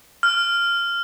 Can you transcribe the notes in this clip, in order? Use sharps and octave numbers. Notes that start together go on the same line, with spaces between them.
F6